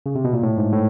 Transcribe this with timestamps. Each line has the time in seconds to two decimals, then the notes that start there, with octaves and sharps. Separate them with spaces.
0.06 C#3
0.15 C3
0.24 B2
0.33 A#2
0.43 A2
0.58 G#2
0.73 A2